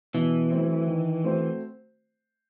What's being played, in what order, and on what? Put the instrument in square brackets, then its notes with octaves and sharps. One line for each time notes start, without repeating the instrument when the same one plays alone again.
[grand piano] B2 [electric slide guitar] E3
[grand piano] F#3 A3 C4 E4
D#3
A3 C4 F#4 C5